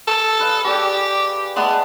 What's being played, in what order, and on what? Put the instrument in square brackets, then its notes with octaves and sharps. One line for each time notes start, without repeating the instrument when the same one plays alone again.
[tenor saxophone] A4
[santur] B4 D#5 F5
[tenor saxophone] G4 [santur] G#4 D5 G5
[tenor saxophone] G#3 [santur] A3 B3 D5